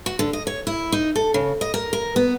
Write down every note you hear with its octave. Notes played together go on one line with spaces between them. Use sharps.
F#4
D3
D#5
C#5
E4
D#4
A4
C#3
D#5
A#4
A#4
B3